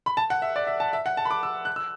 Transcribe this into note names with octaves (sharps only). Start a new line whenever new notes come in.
B5
A5
F#5
E5
D5
E5
A5
E5
F#5
A5
B5
D6
E6
F#6
E6